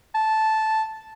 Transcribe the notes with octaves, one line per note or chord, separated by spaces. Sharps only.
A5